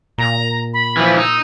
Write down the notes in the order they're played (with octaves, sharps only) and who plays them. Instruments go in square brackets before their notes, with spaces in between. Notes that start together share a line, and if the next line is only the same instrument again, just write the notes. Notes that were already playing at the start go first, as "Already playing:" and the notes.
[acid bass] A#2 [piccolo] A#5
[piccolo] B5
[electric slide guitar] E3 F3
[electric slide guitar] D#4 [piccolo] E6